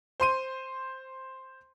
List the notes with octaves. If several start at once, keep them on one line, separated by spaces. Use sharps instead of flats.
C5 C6 D#7